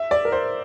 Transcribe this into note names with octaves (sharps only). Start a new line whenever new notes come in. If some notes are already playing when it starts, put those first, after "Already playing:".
Already playing: E5
D5
A#4
C5